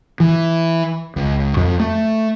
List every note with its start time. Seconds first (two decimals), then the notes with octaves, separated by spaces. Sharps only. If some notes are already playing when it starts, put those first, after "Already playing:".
0.20 E3
1.16 C#2
1.57 F2
1.80 A3